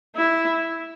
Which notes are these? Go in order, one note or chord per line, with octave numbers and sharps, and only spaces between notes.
E4